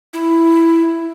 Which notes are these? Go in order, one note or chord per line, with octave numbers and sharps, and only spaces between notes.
E4